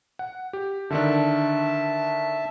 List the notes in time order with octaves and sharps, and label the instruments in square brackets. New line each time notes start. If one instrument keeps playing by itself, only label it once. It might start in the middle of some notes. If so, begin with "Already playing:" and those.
[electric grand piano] F#5
G4
[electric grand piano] D3 D#3 D4 [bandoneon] E5 A5